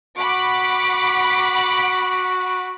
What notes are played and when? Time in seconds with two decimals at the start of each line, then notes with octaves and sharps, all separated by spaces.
0.18 F#4 F#5 B5 D6